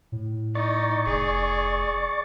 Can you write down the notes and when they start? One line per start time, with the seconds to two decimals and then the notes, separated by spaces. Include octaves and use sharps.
0.12 A2
0.55 D#4 D5 C#6 A6
1.06 F1 G#4